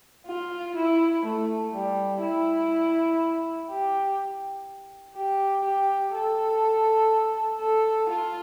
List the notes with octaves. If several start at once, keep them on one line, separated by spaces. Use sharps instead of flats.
F4
E4
A3
G3
E4
G4
G4
G4
A4
A4
F4